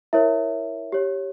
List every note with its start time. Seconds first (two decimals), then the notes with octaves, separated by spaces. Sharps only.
0.13 E4 A#4 C#5 E5
0.92 G4 C#5